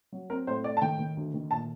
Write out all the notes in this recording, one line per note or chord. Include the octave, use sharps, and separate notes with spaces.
F#3
C4 A#4
A2 C5
A2 D5
A5
D#3 G5
D#3
D2
D#3
A#2 A5